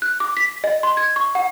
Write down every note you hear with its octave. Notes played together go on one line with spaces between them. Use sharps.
F#6
D6
B6
D#5
C6
G#6
C#6
F#5